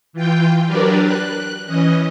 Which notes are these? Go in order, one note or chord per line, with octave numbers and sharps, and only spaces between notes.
E3 F4 G5
F#3 D4 G4 A#4 B4 D5
F#6
E3 C#4 D#5